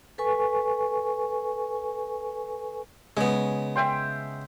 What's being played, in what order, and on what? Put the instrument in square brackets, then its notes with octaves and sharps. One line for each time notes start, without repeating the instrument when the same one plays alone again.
[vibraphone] A4 B4 G#5 C#6
[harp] C#3 [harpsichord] G#3 B3
[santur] E5 G5 C6